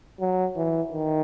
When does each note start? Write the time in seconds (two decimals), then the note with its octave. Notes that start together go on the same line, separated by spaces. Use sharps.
0.20 F#3
0.56 E3
0.92 D#3